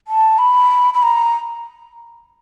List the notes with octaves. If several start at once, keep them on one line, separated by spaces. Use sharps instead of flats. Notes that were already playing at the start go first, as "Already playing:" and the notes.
A5
B5
B5
A#5